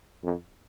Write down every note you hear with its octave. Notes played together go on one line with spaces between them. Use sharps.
F2